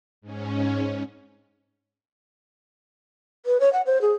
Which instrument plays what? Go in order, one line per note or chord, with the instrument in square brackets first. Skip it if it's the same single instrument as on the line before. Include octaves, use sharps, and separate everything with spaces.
[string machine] G#2 C#4
[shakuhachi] B4
C#5
F#5
C5
G#4